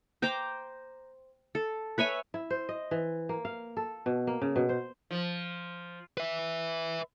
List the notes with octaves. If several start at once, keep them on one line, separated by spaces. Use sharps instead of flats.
C5 G5 A#5 D6
A4
B4 C#5 E5 G#5
E4
C5
D#5
E3
A#3
F5
A4
B2
A#3
C#3
B2
C5
F3
B4 E5